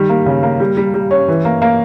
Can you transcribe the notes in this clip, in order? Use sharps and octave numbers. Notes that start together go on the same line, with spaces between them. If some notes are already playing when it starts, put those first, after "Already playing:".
Already playing: D#3 G3
A#3
C#3
A#3
G3
G3
G3
C#4
E3
A#3
A#3